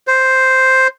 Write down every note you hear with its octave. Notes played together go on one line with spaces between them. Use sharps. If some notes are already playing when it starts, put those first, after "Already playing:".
C5